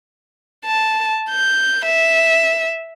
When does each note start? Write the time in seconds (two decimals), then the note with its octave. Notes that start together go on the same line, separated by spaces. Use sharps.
0.65 A5
1.30 G6
1.85 E5